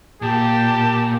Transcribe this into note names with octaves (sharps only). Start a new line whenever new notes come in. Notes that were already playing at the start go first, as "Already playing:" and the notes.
A#2 G4 A5